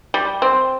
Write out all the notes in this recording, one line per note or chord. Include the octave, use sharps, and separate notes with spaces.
G3
C4